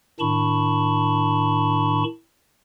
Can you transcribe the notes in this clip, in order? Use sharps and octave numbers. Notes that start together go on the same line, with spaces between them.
A2 D#3 D4 A5 B5 C#6